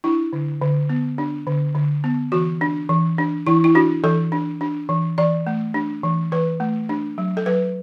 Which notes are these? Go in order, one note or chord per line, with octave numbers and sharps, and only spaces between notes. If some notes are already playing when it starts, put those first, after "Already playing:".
D4 E4
D3
D3
B3
D4
D3
D3
B3
E3 F#4
D4
E3
D4
E3 E4
E4
D4 F#4
E3 A4
D4
D4
E3
E3 D5
A3
D4
E3
E3 B4
A3
D4
F#3
A4
F#3 B4